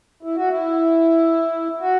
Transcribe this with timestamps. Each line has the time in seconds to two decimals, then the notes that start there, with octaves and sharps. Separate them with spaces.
0.23 E4
0.36 F#4
0.49 E4
1.80 F#4